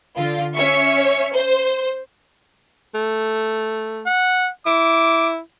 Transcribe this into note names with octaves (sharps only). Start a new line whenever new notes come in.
D3 F4
C#4 C#5 E5 C#6
C5
A3
F#5
E4 D6